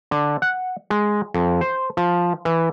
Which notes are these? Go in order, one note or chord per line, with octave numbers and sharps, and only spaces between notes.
D3
F#5
G#3
F2
C5
F3
E3